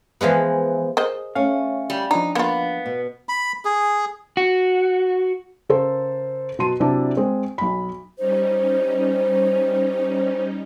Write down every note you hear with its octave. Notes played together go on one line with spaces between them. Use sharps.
E3 F3 G#3 B3
G#4 A#4 C5 D#5
A3 C#4 F5
G3
F3 D4 D#4 A#5
A#3 B3 F4
B2
B5
G#4
F#4
C#3 A4 A#4 C5
B2 F#3 A5 C6 D#7
C3 F#3 D4 E4 D5 A5
G#3 C4
B1 B5
G3 C#4 D#4 C5